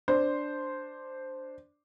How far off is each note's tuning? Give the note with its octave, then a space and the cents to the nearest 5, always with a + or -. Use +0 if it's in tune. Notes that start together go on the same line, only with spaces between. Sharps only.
D4 +0 C5 +0